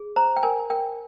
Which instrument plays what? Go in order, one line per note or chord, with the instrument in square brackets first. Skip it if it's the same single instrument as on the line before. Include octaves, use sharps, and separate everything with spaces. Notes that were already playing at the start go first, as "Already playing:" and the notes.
Already playing: [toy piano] G#4
C5 A#5
G5
A#4 G#5
A#4 G5